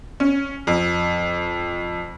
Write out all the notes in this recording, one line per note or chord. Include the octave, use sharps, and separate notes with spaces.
C#4
F2